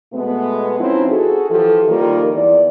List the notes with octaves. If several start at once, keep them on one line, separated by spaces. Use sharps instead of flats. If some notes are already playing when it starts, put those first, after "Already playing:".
B2 G#3 A3 B3
F3 C4 C#4 D#4 E4 B4
F#4 G#4 A4
E3 F3 G4 A4
D#3 F3 G3 A#3 F4 A#4
E2 D5